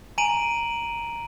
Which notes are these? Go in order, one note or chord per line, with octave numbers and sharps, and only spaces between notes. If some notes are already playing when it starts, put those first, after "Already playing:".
G#5 A#5 D7 D#7 F#7